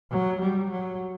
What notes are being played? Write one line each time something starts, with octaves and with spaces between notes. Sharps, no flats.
F#3
G3
F#3